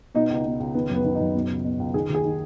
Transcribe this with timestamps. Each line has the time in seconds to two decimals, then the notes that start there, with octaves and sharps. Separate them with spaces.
0.15 B2 D#4
0.30 C#2
0.35 D#4
0.45 B2
0.60 C#2
0.75 D#3 B3
0.90 F#2 B3
1.04 D#3
1.15 F#2 D#4
1.34 B2
1.50 C#2
1.64 B2
1.79 C#2
1.94 D#3 G#4
2.09 D#2 G#4
2.25 D#3